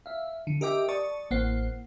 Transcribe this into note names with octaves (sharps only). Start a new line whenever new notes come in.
E5 F5
D3
G4 A#4 D#5 E5 G5 D6
D5 A5 C#6 D#6
A1 A#3 C5 F#5 C7